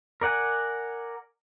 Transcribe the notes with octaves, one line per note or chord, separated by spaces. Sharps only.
A#4 D5 F#5 G#5